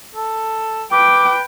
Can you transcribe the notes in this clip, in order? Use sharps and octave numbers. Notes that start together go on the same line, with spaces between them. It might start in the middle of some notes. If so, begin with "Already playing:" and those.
A4
B4 G5 D6